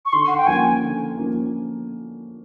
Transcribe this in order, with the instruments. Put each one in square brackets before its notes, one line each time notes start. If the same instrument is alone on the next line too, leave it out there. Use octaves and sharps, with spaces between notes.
[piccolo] C#6
[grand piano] D3 [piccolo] C6
[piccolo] F#5
G5
[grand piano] F3 A#3 C#4 [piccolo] G#5
[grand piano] D3
F3 A#3 C#4